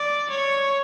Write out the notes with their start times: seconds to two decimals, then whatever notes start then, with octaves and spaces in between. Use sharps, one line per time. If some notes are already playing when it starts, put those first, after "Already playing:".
Already playing: D5
0.30 C#5